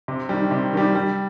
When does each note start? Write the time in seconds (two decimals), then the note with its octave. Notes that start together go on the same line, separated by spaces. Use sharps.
0.08 C3
0.29 D#3 G3
0.51 C3
0.73 D#3 G3
0.95 G3